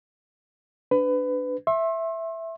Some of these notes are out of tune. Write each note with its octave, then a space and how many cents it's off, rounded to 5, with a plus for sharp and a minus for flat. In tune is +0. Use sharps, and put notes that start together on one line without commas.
D4 -10 B4 +25
E5 +0 C6 +40